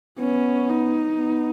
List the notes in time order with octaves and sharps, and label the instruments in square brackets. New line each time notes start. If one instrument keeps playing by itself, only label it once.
[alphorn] B3 [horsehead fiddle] C#4
[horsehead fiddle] D#4
[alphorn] B3